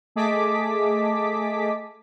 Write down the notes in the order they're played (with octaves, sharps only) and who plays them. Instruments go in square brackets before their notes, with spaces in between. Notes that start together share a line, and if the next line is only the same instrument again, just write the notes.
[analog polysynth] A3 G#4 D#5 A5 D6 B6